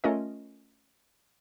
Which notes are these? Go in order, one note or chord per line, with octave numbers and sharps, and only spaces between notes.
A3 C#4 F4 A#4 D#5